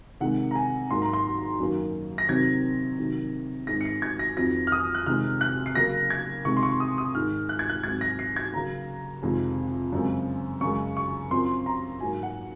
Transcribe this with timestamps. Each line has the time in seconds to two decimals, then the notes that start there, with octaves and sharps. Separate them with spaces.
0.20 C3 D#3 G#3 F#5
0.51 A#5
0.55 G#5
0.91 G#2 F#3 A#3 C6
1.02 A#5
1.13 C6
1.60 F#2 D#3 F#3 A#3
2.18 A#6
2.29 C3 D#3 F#3 C4 G#6
2.99 C3 D#3 F#3
3.67 G#2 D#3 G#3 C4 A#6
3.81 C#7
3.85 C7
4.02 G#6
4.19 A#6
4.37 F2 D#3 F#3 C4 A#6
4.67 F6
4.72 D#6
4.94 F#6
5.06 C3 D#3 G#3 C4 F6
5.41 F#6
5.66 C7
5.75 C#3 F#3 A#3 A#6
6.10 G#6
6.45 C3 D#3 G#3 C#6
6.57 C6
6.63 C#6
6.80 D#6
6.98 D#6
7.14 G#2 D#3 G#3 F6
7.49 F#6
7.59 G#6
7.69 F#6
7.84 G#2 F#3 C4 G#6
8.01 A#6
8.19 C7
8.36 G#6
8.53 C#3 F#3 A#3 A#5
9.22 F2 C3 D#3 G#3 C4
9.93 F#2 C#3 G#3 C4
10.61 F#2 C#3 G#3 C#6
10.97 C#6
11.31 F#2 F3 C4 C6
11.66 A#5
12.00 G#2 F#3 A#3 G#5
12.23 F#5